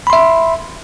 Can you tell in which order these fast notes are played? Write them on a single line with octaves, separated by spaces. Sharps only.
B5 C6 E5